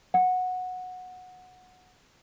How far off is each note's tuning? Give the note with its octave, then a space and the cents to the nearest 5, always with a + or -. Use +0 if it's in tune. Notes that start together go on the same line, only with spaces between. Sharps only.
F#5 -10